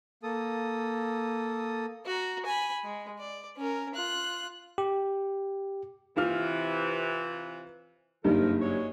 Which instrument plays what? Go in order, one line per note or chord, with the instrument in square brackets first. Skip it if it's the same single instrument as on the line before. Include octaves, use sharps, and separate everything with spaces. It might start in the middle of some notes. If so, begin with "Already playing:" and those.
[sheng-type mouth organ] A#3 A4 D#6
[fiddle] F#4 A#5
G#5 B5
G#3
D5
C#4 A#4
F4 F#6
[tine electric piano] G4
[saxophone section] C3 E3 [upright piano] F4 F6
[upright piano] F#1 G2 D#4 [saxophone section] F3 A#4
[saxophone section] F#3 G#3 C#5